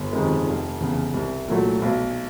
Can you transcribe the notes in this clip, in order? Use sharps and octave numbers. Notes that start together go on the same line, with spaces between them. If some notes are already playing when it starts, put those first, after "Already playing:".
Already playing: G1
F2 C3 D#3 G#3
F1
E2 C#3
C2
A#2 F#3 A3
B1